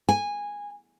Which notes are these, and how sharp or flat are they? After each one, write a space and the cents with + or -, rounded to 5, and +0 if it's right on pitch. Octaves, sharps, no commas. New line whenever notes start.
G#5 -15